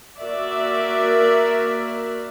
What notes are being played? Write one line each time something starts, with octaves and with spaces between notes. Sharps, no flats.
A#3 F#4 A#4 D5 E5